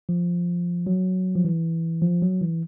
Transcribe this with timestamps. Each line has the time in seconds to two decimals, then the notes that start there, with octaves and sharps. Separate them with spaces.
0.09 F3
0.87 F#3
1.35 F3
1.45 E3
2.02 F3
2.22 F#3
2.41 E3